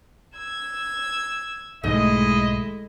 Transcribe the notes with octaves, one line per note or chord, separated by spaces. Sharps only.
E6 G#6
B1 G#2 D#3 G#3 A3 E4 D#5